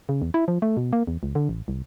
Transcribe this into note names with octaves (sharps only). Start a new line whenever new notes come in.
C#3
E2
E4
F3
A3
B2
A#3
E2
C#2
D3
A1
C2